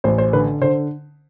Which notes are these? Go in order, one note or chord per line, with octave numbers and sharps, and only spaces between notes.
A1 C5
C5
D3 B4
D3 C5